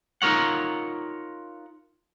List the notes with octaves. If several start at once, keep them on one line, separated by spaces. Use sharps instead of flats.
D#4 F4 A#4 C#5 F#5